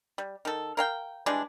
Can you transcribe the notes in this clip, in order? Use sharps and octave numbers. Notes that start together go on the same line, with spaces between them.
G3
D#3 A4
A#4 F5 G5
E3 G3 G#3 D4